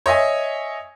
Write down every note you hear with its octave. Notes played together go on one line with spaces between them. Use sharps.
C#5 D#5 E5 G#5